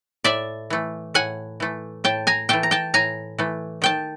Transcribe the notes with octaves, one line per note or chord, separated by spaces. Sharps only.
A2 D5 E5
E3 A3
A2 F#5 G#5
E3 A3
A2 G5 A5
G#5 A#5
E3 A3 G5 A5
A#5
G5 A5
A2 G#5 A#5
E3 A3
D#3 G5 A5